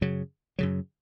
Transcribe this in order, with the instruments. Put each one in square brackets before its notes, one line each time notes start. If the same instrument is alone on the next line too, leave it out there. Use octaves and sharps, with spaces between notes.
[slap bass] F#2 C#3 F#3
F#2 C#3 F#3